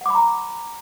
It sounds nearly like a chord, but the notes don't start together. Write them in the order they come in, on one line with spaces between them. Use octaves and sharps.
F#5 D6 B5 A#5